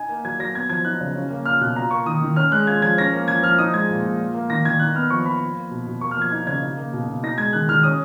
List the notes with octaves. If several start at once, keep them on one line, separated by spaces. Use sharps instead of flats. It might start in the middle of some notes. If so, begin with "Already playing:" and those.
Already playing: D#4 G#5
A#3
F#3 G#6
F#3 A#6
B3 G#6
F3 G#6
D#4 F#6
C#3
C#4
A#3
F4 F6
B2 F#6
F4 A#5
A#3 C#6
D#3 D#6
D#3
C#4 F6
G#3 F#6
F4 G#6
F3 G#6
C#4 A#6
A#3
F3 G#6
F3 F6
D#4 D#6
G#3 G#6
A#2
A#2
F4
A#3
D#3 A#6
D#3 G#6
D#4 F#6
B3 F6
F3 C#6
F3 B5
F4
A#3
B2
B2
A#3 C#6
F6
F3 G#6
D#4 G#6
C#3 G#6
D#4
A#3
B2
B2
D#4 A#6
G#3 G#6
D#3 F#6
D#3 F6
C#4 D#6